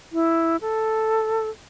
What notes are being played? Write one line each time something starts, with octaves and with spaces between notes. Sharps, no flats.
E4
A4